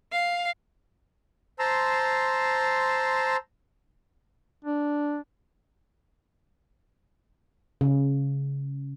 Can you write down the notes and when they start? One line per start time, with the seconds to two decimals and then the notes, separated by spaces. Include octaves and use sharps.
0.12 F5
1.59 C5 A5 A#5 C6 E6
4.64 D4
7.81 C#3